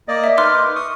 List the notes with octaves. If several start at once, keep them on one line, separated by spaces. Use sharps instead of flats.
A#3 D5 D#5
E5
D#4 A#4 B4 C6 D6 F6
C#6 D#6